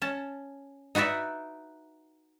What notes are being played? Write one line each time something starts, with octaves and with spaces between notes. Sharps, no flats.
C#4 A5
D#4 F#4 B4 D5 E5